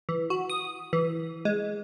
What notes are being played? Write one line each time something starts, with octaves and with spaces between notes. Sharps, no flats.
E3
F#4
D#6
E3
G#3